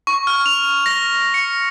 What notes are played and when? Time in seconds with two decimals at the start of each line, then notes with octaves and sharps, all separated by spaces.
0.07 C#6
0.27 F6
0.46 F7
0.86 A#6
1.34 C#7